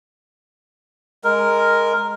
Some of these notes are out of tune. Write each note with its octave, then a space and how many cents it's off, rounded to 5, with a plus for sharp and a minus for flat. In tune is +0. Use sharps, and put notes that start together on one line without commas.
G#3 +0 A#4 +0